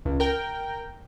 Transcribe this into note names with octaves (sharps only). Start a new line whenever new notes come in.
C#2
A#4 G5